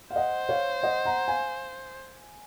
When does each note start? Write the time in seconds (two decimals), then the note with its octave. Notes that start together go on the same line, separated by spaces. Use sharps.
0.11 F5
0.16 C5 D#5 F#5
0.49 C#5 F5
0.83 D#5 F#5
1.05 F#5 A#5
1.27 F5 G#5